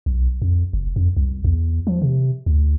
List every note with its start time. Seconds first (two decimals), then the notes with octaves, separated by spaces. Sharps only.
0.06 B1
0.42 F2
0.73 F#1
0.96 F2
1.17 C2
1.44 E2
1.87 F3
2.02 C3
2.46 D2